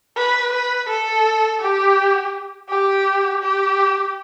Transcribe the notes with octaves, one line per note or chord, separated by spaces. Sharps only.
B4
B4
A4
G4
G4
G4